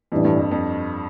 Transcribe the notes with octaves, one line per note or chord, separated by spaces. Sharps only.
F2 A2 E3 G3 D4
G2
F2
F2